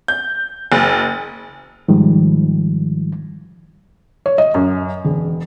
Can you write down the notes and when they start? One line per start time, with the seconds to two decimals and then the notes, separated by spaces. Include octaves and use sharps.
0.08 G6
0.72 F#1
1.88 G#2 D#3 F3 G3
4.26 C#5
4.38 D#5
4.54 F#2
5.05 E1